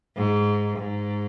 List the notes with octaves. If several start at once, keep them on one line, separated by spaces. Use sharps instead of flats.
G#2
G#2